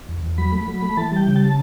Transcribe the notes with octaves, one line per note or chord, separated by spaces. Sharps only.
E2
E2
F#3 B5
A3
F#3
A3
E3 A5
G3 G5
C#3
A5